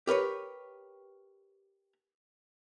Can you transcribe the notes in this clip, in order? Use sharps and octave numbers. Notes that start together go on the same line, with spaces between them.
G4 A#4 B4 C#5